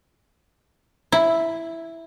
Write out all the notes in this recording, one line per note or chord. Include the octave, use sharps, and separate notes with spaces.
E4